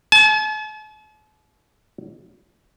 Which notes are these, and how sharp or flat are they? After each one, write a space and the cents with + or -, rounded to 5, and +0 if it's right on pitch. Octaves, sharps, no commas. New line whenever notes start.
A5 -45